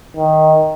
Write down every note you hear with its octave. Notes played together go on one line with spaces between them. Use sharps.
D#3